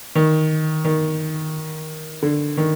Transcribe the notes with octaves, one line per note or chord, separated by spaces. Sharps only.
D#3
D#3
D3
D#3